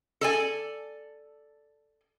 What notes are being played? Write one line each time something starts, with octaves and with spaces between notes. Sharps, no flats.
A4 D5 G#5